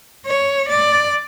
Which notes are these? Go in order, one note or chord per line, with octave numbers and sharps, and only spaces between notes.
C#5
D5